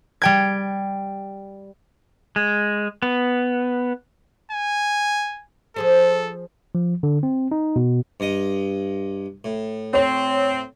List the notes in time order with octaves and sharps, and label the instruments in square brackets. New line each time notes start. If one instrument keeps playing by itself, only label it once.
[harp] G3 G5 G#6
[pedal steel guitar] G#3
B3
[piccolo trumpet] G#5
[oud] F3 G#4 C5 [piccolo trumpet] A4
[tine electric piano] F3
D3
C4
D#4
B2
[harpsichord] G2 D#5
A2
[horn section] C4 [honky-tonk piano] C#5